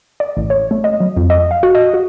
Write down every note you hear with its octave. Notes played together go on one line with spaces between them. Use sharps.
D5
A1
C#5
A3
D#5
F#3
F2
D#5
F5
F#4
D#5
F#4